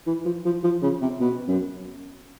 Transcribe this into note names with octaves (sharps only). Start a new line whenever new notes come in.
E3
F3
F3
F3
C#3
C3
B2
F#2